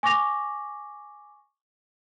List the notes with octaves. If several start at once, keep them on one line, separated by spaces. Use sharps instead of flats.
G#5 C#6 D6 A#6 F7